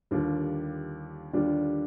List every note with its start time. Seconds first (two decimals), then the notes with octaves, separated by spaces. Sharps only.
0.11 D#2 D3 G3 D4 F4
1.33 D#2 D3 G3 D4 F4